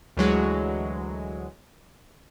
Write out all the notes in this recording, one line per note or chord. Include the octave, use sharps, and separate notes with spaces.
D2 E3 F#3 G#3